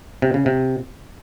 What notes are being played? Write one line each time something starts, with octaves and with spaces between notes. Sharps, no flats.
C3
C#3
C3